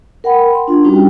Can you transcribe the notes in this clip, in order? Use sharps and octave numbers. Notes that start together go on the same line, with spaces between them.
A#4 F#5 G5 B5
C6
D4 F4
G3 C#4 D#4 E4 F#4 G4
G5